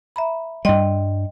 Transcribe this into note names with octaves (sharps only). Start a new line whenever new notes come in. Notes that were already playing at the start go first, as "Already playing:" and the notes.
E5 A#5 B5
G2 G3 D#5 G5 C6